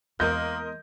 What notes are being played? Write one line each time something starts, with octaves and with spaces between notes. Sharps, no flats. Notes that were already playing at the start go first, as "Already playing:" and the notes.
E2 G#3 A#3 A#4 D#5 C6 G6